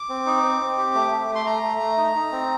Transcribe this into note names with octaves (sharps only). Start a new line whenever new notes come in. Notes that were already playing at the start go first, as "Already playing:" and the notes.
Already playing: D6
C4
D#4
C4
C4
G4
A3
A3
A3
C6
A3 A#5
A3
A3
D#4
D#4
C4